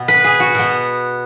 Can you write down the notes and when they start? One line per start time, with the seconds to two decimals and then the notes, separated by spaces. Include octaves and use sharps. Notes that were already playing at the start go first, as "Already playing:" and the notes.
Already playing: B2 B3
0.08 B4
0.24 G#4
0.40 F#4
0.55 B2 B3